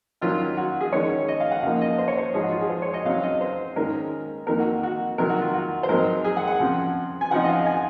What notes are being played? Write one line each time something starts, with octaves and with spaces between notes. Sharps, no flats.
D#3 F#3 C#4 F4
F#4
G#4
D#3 G#3 C#4 C#5
D#5
F5
F#5
C#3 F3 A#3 D#4 F5
D#5
C5
C#5
C5
G#2 F3 G#3 D#4 G#4
F#4
F4
G#4
C5
C#5
D#5
F2 C#3 F#3 C4 D#4 F5
D#5
C5
G#2 D#3 G#3 C#4 A#4
F2 D#3 A#3 D#4 A#4
F#4
F#4
C3 D#3 F#3 A#4
F#4
F4
F#4
C5
G#2 F#3 C4 D#4 A#4
G#4
F#5
F#5
C#3 F3 C4
G#5
C#3 F3 C4 D#4 F#5
D#5
F5
G#5